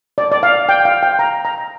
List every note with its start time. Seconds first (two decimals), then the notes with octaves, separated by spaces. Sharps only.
0.18 D5
0.32 D5
0.43 F5
0.69 G5
0.85 F5
1.03 G5
1.19 A#5
1.45 A#5